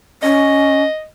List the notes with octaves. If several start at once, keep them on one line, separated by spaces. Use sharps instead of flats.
C#4 D#5